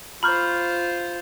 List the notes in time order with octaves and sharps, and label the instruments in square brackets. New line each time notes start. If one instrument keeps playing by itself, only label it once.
[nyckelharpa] F4 C5 [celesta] A#5 F6 G6 [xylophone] B5 C#6